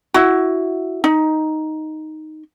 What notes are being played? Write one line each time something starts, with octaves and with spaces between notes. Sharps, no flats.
E4 F#4
D#4